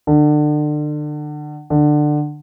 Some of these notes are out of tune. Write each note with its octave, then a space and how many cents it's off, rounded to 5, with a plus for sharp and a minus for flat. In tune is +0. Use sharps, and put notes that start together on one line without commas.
D3 +30
D3 +20